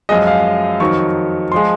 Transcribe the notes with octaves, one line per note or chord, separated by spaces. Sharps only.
F#2 F3 G#3 D#5
F5
F2 D#3 F#3 C#6
F3 G#3 C6